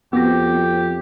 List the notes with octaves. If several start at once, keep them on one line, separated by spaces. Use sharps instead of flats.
F2 B3 C4 F#4 G4 A#6